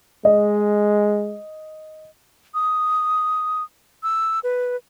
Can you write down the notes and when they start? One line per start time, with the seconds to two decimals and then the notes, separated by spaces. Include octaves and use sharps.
0.25 G#3 D#5
2.54 D#6
4.03 E6
4.43 B4